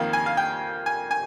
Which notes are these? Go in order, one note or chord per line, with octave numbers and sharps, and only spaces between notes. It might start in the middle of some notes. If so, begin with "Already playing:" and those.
Already playing: F2 D#3 A#3 F5
G#5
F5
G5
G#5
G#5